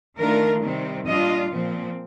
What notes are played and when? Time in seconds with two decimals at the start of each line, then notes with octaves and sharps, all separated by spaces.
0.19 D#3 A3 D4 F4 A#4
0.63 C3 D#3 G3 C4
1.07 A#2 G3 D4 F4 D#5
1.52 A#2 F3 C4